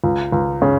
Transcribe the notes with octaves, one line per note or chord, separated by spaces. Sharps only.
C#2
C#2
C#3